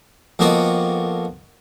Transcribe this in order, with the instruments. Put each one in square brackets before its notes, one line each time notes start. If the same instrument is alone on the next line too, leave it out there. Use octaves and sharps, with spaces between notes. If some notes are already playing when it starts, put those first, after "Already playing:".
[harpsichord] F2 A#3 B3 F#4 D5 D#5